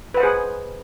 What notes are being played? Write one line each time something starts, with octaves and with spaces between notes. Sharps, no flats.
G#4 B4 C5 F#5